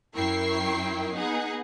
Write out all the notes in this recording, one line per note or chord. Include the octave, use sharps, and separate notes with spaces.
F#2 E4 A#4 G5 C#6 C7
B3 D#4 G#4 F#5